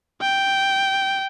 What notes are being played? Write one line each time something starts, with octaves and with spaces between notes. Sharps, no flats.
G5